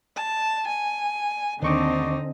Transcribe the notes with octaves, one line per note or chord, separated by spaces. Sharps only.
A5
G#5
D#2 D3 C4 D#4 C#6 D6